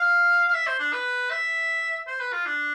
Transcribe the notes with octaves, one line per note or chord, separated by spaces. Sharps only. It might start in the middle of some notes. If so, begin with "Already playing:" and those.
Already playing: F5
F5
E5
C5
D4
B4
E5
C5
B4
F4
D4